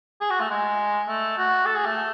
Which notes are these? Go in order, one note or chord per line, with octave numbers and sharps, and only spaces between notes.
G#4
F#4
A3
G#3
A3
F#4
A4
G#4
A3